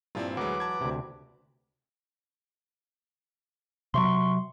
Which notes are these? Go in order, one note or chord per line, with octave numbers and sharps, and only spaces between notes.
G2 A#2 F3 C4 E4 F4
D2 E3 F#3 G#3 B4 F#5 D6
A5 G#6
D2 C3
C3 F#3 C6 C#6